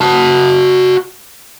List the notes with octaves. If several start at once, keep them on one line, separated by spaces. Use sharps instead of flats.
F#4 A5